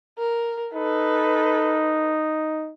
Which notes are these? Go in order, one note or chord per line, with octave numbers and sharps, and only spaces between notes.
A#4
D#4 A4 B4